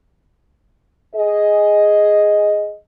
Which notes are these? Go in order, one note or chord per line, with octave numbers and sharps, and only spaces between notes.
G#4 D#5